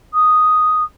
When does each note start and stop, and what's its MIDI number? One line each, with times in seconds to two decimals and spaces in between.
0.14 0.83 87